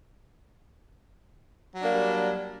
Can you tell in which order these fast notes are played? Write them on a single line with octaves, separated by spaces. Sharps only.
F#3 D4 A#3 G3